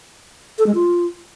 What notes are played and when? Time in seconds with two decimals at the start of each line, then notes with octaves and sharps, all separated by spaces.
0.59 A4
0.67 G#3
0.75 F4